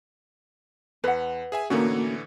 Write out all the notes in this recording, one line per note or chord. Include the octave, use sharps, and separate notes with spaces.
E2 B4 F#5
G#4 E5 G#5
A2 D3 E3 A#3 C#4 D#4 F#4 C#5